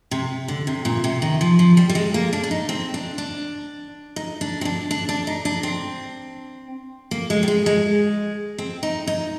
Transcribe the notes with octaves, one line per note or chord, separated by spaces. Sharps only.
C3
D3
C3
A#2
C3
D#3
F3
F3
G3
G3
G#3
A#3
D4
D4
D#4
C4
D4
D4
D#4
D4
C4
D4
D4
D4
D#4
D4
C4
A#3
G#3
G3
G#3
G#3
C4
D#4
D#4